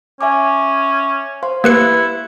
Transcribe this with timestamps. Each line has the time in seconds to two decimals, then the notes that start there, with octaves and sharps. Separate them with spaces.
0.21 C#4 E5 G#5 D6
1.43 C5 F5 C6
1.64 A#3 E4 G4 B4 F#6 C#7